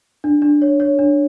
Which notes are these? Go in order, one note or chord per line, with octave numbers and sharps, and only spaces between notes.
D4
D4
C#5
C#5
D4